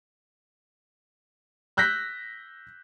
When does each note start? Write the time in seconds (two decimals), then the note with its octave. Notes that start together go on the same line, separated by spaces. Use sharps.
1.77 E6 F#6 G6 A#6 B6